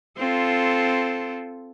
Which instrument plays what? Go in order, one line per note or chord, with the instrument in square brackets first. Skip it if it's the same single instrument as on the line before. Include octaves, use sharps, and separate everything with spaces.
[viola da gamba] C4 F4 A4